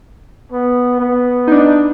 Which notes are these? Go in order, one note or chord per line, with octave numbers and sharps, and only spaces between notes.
B3
B3
D4 D#4